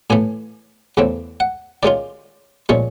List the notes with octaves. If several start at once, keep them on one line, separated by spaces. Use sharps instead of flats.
A2 E3 A3 G#5
E2 C#3 E3 A3 C4
F#5
D#3 G#3 C#4 F4 D5
A#2 F3 G#3 C#4 C#5